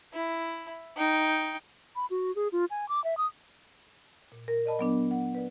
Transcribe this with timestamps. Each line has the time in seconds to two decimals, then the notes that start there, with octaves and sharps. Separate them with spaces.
0.14 E4
0.97 D#4 G5
1.96 B5
2.10 F#4
2.36 G#4
2.52 F4
2.70 G#5
2.89 D6
3.04 E5
3.17 D#6
4.32 A#2
4.48 A#4
4.66 D5 D#5 A5 B5
4.79 F#3 B3 D4
5.11 F#5
5.35 B4 D5